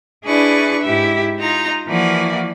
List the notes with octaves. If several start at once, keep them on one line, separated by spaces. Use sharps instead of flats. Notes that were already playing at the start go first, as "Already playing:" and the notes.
D4 E4 G#4 B4 D5 C#6
G#2 E4 G4 E5
D#4 F4 A#5
E3 F3 A#3 F#4 D5